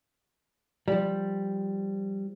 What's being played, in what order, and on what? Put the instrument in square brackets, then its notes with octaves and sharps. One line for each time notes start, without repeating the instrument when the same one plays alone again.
[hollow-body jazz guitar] F3 G3